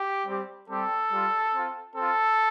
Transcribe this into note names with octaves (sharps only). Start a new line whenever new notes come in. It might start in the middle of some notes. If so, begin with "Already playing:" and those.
Already playing: G4
G3 C4 G4
G3 C4 G4 A4
G3 F4
C4 F4
C4 F4 A4